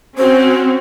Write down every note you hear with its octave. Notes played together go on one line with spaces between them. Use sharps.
C4 C#4 F#4 C5